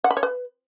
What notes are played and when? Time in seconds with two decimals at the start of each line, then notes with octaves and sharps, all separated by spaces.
0.04 F#5
0.11 B5
0.17 C#5
0.23 B4